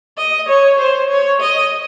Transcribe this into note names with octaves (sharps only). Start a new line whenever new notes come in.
D#5
C#5
C5
C#5
D#5